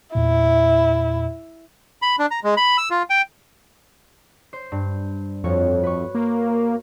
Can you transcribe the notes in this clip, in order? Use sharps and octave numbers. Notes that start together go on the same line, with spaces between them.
E2 A#2 E4
B5
D4
A#5
G#3
B5
E6
F4
G5
C5
G2
F2 F#4 C#5
B4 C#6
A#3